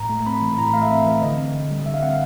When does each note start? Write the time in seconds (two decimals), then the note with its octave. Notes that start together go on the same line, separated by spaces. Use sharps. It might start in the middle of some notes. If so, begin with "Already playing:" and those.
Already playing: A2 A#5
0.09 A3
0.27 C4 B5
0.42 E3
0.58 A2 A#5
0.67 B5
0.73 A3 F5
0.82 E5
0.90 C4
1.06 E3
1.22 D3 D#5
1.38 C4
1.54 D3
1.71 G3
1.86 D3 E5
1.94 F5
2.03 C4 F#5
2.10 F5